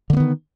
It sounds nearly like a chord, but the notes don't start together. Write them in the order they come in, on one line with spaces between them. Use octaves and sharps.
D3 A#3 B3 D#3